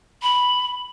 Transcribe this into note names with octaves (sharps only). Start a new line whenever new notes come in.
B5